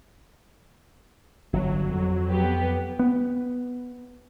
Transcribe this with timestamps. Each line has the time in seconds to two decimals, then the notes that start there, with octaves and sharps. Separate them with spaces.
1.53 G1 F#3
1.89 F2
2.29 B3 G4 B4
2.99 B3